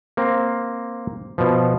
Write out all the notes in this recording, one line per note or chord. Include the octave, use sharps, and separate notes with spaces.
A#3 C4
B2 F3